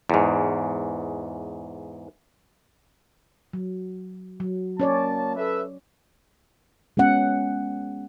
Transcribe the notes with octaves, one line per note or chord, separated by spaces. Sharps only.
E2 G#2
F#3
F#3
A#3 C#4 C#5 D5 A5
A4 B4 E5
G#3 B3 C#4 F#5